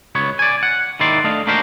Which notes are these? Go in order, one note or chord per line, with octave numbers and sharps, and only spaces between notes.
C#2 B3 C#5
D5 G#5
F#5
D#2 G#2 D#3 E4 D5 C6
A3 D4 D#5 F5
A#3 D4 F#4 G4 A#4 C5